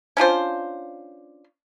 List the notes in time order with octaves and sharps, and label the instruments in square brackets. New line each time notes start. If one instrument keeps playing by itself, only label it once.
[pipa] C#4 D4 F4 C5